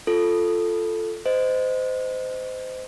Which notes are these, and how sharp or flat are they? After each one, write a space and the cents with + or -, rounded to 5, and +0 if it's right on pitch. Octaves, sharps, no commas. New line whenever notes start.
F4 +0 A4 +0
C5 -25 D#5 +0